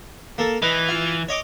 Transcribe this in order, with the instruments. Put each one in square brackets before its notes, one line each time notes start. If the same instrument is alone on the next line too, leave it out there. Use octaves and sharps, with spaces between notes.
[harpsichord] A#3 A4
[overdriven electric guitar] E3 [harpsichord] B4 D#5
[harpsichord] F4
C#5 D#5 D6